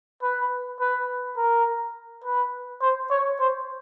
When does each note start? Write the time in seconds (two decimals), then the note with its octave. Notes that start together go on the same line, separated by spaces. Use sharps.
0.23 B4
0.80 B4
1.37 A#4
2.24 B4
2.81 C5
3.10 C#5
3.39 C5